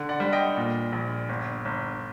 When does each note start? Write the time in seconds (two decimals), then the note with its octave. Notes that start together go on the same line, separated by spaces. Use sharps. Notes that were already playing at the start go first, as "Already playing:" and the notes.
Already playing: D3
0.09 D5 F#5
0.20 G3
0.32 D#5 G5
0.57 A#2
0.92 A#1
1.29 G1
1.65 G1